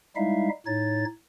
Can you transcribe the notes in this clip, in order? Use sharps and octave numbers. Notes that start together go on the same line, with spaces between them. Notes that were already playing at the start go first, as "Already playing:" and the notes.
G3 G#3 D#4 E4 E5 F5
A2 D#4 C#5 A6